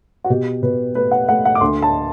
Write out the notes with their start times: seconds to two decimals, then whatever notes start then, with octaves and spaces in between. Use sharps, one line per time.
0.24 F#4
0.30 B2 G4
0.62 B2 B4
0.95 A3 B4
1.11 F#5
1.29 A3 F#5
1.45 F#5
1.55 D6
1.61 D2 C6
1.82 A5